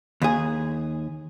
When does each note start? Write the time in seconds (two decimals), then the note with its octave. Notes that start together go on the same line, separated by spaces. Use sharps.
0.22 D#2 G#4